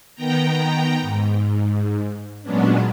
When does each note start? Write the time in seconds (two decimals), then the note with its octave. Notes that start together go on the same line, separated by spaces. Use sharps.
0.15 D#3 B3 G5 A#5
1.01 G#2
2.42 A#2 F#3 G#3 B3 C#4 D4